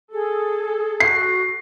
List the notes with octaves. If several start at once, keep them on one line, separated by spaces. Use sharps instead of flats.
G#4 A4
F#4 C7